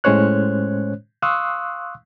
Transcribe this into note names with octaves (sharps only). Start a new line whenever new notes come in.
A2 G#3 C#4 C5 C#5 F#6
F5 C6 C#6 D#6 E6 F#6